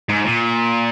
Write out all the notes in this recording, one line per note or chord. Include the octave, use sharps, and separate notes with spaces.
G#2
A#2